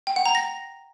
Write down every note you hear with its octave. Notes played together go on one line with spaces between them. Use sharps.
G5
F#5
A#5
A#6